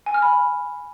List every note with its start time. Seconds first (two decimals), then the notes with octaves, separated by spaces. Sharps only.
0.06 G#5
0.14 F6
0.22 B5